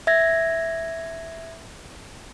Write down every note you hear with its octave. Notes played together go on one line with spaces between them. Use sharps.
E5 G#6 A#6